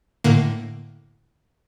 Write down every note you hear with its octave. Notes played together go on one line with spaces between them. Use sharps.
A2 D3 A#3